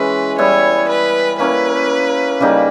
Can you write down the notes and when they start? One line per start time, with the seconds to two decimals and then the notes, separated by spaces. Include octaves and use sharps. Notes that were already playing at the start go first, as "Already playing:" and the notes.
Already playing: E3 G#3 C#4 E4 B4
0.38 G3 B3 E4 C#5
0.89 B4
1.39 A#3 C#4 E4 B4
2.40 C#3 G3 A#3 D#4